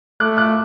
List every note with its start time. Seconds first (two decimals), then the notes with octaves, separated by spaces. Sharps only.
0.20 A3 D6 F#6
0.37 D6 F#6